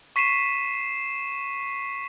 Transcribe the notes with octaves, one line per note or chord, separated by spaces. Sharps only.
C#6 B6 C7 D#7 E7